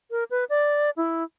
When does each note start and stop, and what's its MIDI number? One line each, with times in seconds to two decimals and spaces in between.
0.11 0.24 70
0.31 0.44 71
0.49 0.90 74
0.97 1.23 64